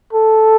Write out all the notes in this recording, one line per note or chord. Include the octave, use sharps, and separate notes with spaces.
A4